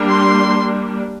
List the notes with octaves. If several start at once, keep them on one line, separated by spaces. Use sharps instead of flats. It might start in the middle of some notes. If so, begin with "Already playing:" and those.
Already playing: G3 A#3 D4
C6